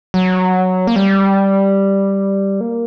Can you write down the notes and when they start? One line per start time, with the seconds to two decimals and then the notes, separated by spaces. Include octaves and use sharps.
0.14 F#3
0.87 A#3
0.96 G3
2.61 A#3